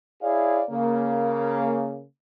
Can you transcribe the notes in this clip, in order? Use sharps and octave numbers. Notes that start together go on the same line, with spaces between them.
E4 G#4 C#5 D5 F5
C#3 A#3